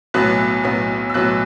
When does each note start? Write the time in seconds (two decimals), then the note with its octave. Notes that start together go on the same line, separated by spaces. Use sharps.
0.14 B1 A2 F#3 B3 F#6
0.64 B1 A2 F#3 B3
1.10 E6
1.14 B1 A2 F#3 B3 F#6